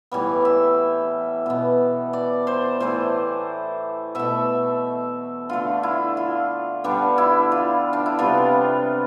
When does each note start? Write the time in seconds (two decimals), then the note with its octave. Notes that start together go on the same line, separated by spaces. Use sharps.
0.11 A2 E3 G3 B3
0.45 E5
1.46 B2 B3
2.13 D5
2.47 C5
2.80 A2 E3 A3 C5
4.15 B2 A3 E5
5.49 D3 A3 F4
5.83 E4
6.17 F4
6.84 D3 G3 B3 D4
7.18 E4
7.52 F4
7.93 D4
8.06 E4
8.19 C3 G3 B3 F4